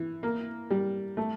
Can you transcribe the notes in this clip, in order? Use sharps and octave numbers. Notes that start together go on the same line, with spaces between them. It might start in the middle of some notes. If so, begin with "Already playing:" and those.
Already playing: E3
A#3
G3
A3